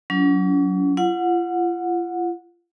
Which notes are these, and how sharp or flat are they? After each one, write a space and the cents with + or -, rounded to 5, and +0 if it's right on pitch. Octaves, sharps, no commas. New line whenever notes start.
F#3 +0 C#4 +40 F4 -45
F4 -40 F#5 -20